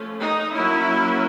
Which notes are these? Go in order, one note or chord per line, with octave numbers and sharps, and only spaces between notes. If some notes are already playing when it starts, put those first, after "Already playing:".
Already playing: F3 A3 C#4
D#4
F#3 A#3 C#4 E4